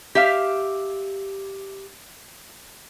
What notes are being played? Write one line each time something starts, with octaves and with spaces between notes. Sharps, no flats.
G4 E5 F5